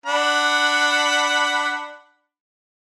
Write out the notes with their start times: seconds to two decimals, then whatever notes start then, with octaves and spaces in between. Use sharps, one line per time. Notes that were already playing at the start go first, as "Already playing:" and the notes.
0.06 D4 F#5 B5